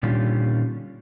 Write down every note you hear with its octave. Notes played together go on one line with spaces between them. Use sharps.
A#2 D3 D#3 G3 C#4 F4